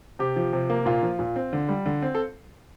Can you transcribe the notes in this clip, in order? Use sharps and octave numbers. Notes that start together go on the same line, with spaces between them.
C3 G4
F3
C3
A#3
A#2 F4
F3
A#2
C4
D3
G3
D3
C4
A4